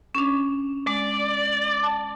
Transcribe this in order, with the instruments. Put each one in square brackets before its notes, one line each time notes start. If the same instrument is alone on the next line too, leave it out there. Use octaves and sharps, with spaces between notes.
[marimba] C#4 D4
[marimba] G#3 [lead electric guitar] D5
[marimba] A5